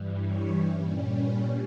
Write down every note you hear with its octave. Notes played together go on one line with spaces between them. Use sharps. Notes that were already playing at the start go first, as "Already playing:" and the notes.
Already playing: G2 E3 G3
C#5
A#2 G3 C#4
B4